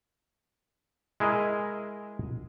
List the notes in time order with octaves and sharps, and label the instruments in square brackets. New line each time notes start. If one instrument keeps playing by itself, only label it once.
[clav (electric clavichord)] G#3 E4 G#4 A#4 D#5